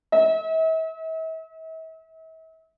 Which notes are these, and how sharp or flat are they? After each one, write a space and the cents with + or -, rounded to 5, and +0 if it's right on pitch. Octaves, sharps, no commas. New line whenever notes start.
E5 -40